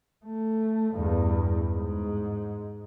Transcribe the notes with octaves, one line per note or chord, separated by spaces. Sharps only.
A3
E2 G2
G#2